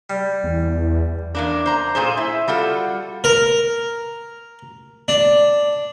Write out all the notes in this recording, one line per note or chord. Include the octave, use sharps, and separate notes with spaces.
G3
E2
E2 A#3 D4
C5 A#5
A#2 G#4 C5
E4
G3 F4 F#4 A4
A#4
D4